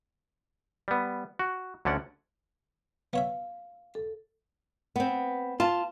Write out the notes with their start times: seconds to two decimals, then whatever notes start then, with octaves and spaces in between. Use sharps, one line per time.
0.88 G3 B3
1.39 F#4
1.85 D2 D3 C#4 D5 F#5
3.13 B3 C#5 E5 F5
3.95 A4
4.96 B3 C4
5.60 F4 A5